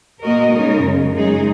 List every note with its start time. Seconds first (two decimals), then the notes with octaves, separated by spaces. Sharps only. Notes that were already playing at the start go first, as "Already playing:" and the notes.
0.23 A#2 A#3 F#4 A#4 D#5
0.52 C#3 G#3 D#4 A#4
0.82 F#2 C#3 G#3
1.13 F#2 C#3 G#3 D#4 G#4